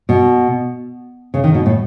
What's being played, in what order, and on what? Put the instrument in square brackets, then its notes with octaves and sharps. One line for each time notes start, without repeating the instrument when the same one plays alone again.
[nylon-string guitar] B2
C#3
D#3
B2
A2